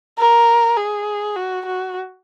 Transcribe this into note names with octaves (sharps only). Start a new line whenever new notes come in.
A#4
G#4
F#4
F#4